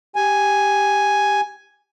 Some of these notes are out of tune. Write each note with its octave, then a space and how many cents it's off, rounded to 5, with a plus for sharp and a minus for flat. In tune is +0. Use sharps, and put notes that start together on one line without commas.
G4 +0 G#5 +0